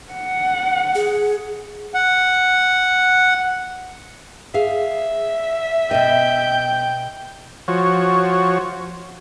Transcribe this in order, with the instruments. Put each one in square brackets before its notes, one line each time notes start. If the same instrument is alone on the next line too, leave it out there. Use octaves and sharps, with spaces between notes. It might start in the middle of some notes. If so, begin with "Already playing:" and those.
[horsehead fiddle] F#5
[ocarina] G#4
[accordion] F#5
[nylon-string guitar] G#4 F5 [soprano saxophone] E5
[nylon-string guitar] B2 D#5 [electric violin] G5
[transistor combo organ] F3 F#4 C#5